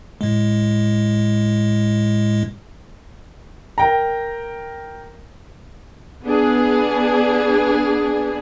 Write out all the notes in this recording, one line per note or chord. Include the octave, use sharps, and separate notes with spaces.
A2 G#3
A#4 G5 A#5
B3 D4 G#4